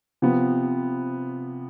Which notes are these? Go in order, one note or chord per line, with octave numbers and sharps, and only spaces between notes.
C3 F3 B3